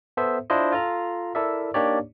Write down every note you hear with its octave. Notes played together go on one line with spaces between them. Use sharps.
B3 A4 C5 E5
D4 E4 F4 C5 D#5
F4 A4 A#5
E4 A4 A#4 D5 E5
A#3 D4 D#4 G4 C#5 D5